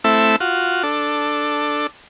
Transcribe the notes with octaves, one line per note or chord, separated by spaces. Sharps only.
A3 C4 E4 A4 E5
F4 F#4
D4 A4